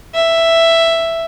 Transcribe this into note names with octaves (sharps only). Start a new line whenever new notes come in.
E5